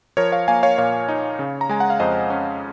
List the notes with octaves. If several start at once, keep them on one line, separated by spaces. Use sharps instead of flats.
F3 A#4 C#5
C#5 F5
A#3 F5 G#5
C#5 F5
A#2 C#5 F5
D#4
C#3
A#5
G#3 G#5
F#5
F5
F2 C5 D#5
C#4